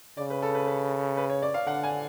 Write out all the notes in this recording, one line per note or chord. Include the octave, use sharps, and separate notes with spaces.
C#3 D5
B4
A4
B4
B4
B4
C#5
D5
F5
D3 F#5
G#5